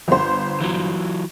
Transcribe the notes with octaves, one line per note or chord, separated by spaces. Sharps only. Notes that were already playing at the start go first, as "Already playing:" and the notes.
G1 C5
E3 F#3